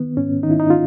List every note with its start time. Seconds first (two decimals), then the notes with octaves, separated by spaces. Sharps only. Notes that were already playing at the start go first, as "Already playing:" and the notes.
Already playing: D#3 B3
0.17 G#2 C#4
0.43 D#3 D#4
0.51 E4
0.60 D#4
0.70 F4